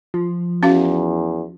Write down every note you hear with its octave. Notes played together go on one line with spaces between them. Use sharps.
F3
E2 C#4 F#4 F5